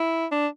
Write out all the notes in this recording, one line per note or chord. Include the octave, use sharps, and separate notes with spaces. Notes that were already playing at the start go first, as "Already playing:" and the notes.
Already playing: E4
D4